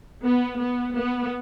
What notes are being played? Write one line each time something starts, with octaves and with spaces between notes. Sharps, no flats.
B3
B3
B3